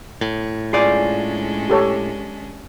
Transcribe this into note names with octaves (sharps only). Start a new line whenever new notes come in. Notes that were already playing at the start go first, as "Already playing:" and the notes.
A2
G#3 C#4 D4 F4 G#4 D5
G4 A4 C#5